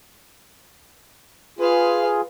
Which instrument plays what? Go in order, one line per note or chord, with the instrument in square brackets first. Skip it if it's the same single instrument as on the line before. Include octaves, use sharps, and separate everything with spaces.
[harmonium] F4 G#4 [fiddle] B4 F5